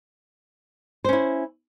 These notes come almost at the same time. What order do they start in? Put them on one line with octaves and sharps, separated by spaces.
C5 C#4 E4